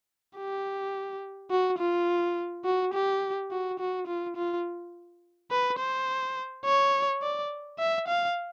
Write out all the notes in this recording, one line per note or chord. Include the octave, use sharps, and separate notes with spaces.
G4
F#4
F4
F#4
G4
F#4
F#4
F4
F4
B4
C5
C#5
D5
E5
F5